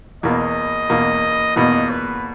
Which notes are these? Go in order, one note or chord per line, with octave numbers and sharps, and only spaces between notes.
E2 B2 A#3 D#5
E2 B2 A#3
E2 B2 A#3 D#5
B4